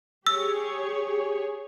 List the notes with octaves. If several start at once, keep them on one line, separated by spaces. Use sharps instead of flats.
G4 G#4 C#5 E6